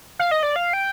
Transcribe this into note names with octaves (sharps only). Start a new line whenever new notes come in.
F5
D#5
D5
F5
G5